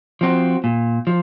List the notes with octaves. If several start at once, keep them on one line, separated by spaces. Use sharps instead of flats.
F3 C4 F#4
A#2
F3